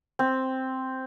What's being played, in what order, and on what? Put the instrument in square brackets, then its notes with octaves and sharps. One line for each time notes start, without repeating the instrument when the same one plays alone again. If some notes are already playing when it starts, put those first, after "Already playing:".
[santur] C4